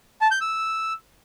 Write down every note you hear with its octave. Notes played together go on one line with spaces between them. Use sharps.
A5
G6
E6